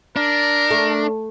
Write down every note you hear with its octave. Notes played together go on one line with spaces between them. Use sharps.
D4 A#4
A3